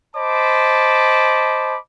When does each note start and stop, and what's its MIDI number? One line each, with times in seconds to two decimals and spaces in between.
0.16 1.77 72
0.16 1.77 75
0.16 1.77 81
0.16 1.77 83
0.16 1.77 86